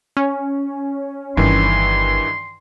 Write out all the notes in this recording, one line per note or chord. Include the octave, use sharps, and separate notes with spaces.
C#4
G1 G2 D#3 E3 C6